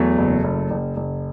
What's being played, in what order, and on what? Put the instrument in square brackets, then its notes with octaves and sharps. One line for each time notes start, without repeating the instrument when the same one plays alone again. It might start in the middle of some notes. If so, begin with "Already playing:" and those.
Already playing: [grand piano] E2 [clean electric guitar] F#3 A3
[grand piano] F#1
F#1
F#1
F#1